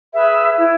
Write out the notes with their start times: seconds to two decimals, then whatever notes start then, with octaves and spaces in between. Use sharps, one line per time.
0.12 G#4 B4 E5
0.57 E4